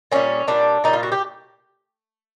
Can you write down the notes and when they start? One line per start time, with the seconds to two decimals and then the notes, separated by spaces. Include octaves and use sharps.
0.12 A#2 G3 C#4
0.48 A#2 G3 D4
0.84 A#2 G3 D#4
0.93 F4
1.03 F#4
1.12 G4